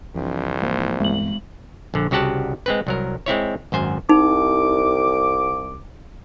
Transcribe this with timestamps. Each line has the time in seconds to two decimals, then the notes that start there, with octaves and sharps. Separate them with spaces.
0.15 C2 F2 E3 D4
0.62 G#2 E3 F3 A#3 C5
1.00 G2 E3 G#3 B3 F#7
1.94 A#1 D3
2.11 C2 C#3 F#4 G4 F#5 A5
2.66 G#3 C4 B4
2.87 C2 F#3 A#4
3.26 G#3 C4 E4 C#5
3.72 G#1 F#2 C5 G#5
4.09 C2 D#4 D6